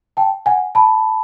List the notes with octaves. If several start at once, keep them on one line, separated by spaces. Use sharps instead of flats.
G5 A5
F#5 G#5
A5 B5